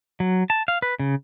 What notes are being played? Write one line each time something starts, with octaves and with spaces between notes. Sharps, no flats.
F#3
A5
F5
B4
C#3